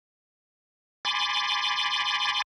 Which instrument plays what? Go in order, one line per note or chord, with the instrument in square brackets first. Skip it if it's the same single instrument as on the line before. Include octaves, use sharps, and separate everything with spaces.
[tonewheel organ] G#5 B5 C6 D6 A6